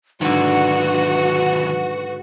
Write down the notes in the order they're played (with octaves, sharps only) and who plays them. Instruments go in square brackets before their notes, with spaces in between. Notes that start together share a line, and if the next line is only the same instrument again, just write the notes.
[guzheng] G#2 D3 [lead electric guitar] D#3 F#3 [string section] F#4 [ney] B4